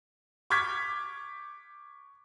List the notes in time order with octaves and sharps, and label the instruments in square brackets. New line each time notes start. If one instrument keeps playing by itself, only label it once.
[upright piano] C#6 D6 F6 G6 G#6 B6